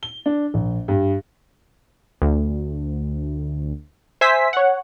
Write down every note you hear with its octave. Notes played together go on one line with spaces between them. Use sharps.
G7
D4
A#1
G2
D2
C5 E5 G#5 E6 B6
C#5 F#5